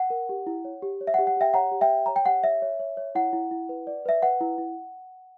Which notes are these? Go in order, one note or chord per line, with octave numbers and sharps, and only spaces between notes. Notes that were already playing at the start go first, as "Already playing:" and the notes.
Already playing: F#5
A#4
G4
E4
C#5
G4
C#5
E5
F#5
G4
F#5
G4 E5 G5
C#5 F#5 A#5
G4
E5 G5
C#5
C#5 A#5
G5
G4 F#5
C#5 E5
C#5
C#5
C#5
E4 F#5
E4
E4
B4
D5
B4 E5
B4 F#5
E4
E4